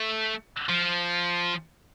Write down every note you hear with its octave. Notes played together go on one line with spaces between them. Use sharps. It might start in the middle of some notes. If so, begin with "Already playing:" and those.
Already playing: A3
F3